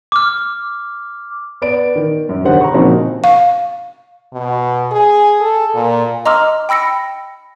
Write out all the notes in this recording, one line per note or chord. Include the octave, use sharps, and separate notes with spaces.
D6 F6
B3 D5 D7
D#3
F#2
E1 D3 D#3 G4 C5 F#5
A#5 C#6
A#2 C#3 F3 C4 D#4 F#4
F5
B2
G#4
A4
A#2
D#5 A#5 C6 D6 E6 F6
G5 B5 E6 A#6 C#7